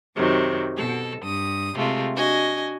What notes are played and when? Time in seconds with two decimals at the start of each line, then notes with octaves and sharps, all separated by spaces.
0.15 F#2 C3 D#3 F#3
0.77 B2 A4
1.22 G2 D#6
1.75 C3 G#3 A3 F4
2.14 D4 F#4 D#5 G#5